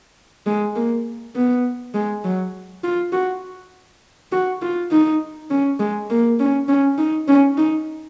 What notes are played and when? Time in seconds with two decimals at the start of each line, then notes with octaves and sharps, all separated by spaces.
0.46 G#3
0.76 A#3
1.36 B3
1.95 G#3
2.24 F#3
2.84 F4
3.13 F#4
4.32 F#4
4.62 F4
4.91 D#4
5.50 C#4
5.80 G#3
6.10 A#3
6.40 C#4
6.68 C#4
6.98 D#4
7.28 C#4
7.57 D#4